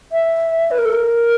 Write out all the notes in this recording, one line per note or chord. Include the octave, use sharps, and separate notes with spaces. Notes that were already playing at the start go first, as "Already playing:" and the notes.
E5
B4
A#4
A4
A#4